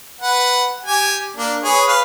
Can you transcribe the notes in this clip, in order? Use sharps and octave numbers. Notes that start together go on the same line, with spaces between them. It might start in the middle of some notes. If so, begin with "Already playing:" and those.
B4 F#5
G4 G#5
A#3 D4
G#4 B4 C#5
B4 F5